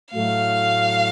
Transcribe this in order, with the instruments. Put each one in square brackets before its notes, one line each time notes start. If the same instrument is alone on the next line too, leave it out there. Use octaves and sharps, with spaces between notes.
[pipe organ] A2 F#3 A3 [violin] F5